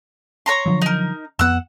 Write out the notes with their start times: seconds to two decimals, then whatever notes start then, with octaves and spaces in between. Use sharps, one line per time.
0.46 C#5 A#5 C6
0.66 D3 F3 F#3
0.82 D#4 A#4
1.39 F2 B3 F#5 E6